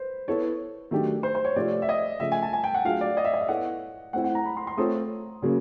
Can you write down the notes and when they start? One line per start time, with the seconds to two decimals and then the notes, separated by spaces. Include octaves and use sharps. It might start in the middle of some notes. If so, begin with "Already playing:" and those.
Already playing: B4 C5
0.28 B3 E4 A4 C#5
0.91 D#3 F#3 A3 D4 G4
1.23 C5
1.35 C5
1.45 C#5
1.56 C3 F3 A3 C4 F4 D5
1.82 E5
1.89 D#5
2.20 C#3 F3 A3 E5
2.32 G#5
2.42 A5
2.53 G#5
2.64 G5
2.74 F#5
2.85 F#3 A3 D4 F4 G#4 F5
3.01 D5
3.17 D#5
3.25 E5
3.34 D#5
3.41 E5
3.48 B3 E4 A4 C#5 F#5
4.13 A3 C4 E4 F#5
4.24 F#5
4.35 A#5
4.45 B5
4.57 C6
4.67 C6
4.77 A3 C4 F4 A4 C#5 D#6
5.42 C#3 F#3 A#3 C#4